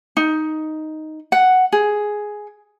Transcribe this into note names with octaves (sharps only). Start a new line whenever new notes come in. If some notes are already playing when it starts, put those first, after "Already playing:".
D#4
F#5
G#4